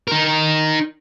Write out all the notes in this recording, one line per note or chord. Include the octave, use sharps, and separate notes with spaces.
D#4 A#4